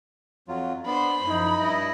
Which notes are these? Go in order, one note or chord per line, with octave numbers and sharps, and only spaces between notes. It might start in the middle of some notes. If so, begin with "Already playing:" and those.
F2 F#3 F4
B3 D4 C5 B5
F#2 F3 D#4 E4
G2 E4 D#5